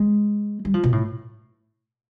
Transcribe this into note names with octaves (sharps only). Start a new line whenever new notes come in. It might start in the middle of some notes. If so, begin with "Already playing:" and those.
Already playing: G#3
G3
F3
B2
A2